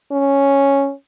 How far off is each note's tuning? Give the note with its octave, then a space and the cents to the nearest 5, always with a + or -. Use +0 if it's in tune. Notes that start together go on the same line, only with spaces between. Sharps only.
C#4 +0